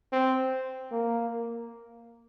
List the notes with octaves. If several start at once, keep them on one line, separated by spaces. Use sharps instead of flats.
C4
A#3